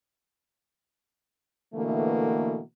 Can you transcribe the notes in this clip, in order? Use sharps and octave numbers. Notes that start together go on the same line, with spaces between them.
B2 D3 E3 A3 A#3